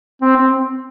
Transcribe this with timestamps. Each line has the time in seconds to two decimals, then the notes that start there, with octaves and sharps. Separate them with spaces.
0.22 C4
0.36 C4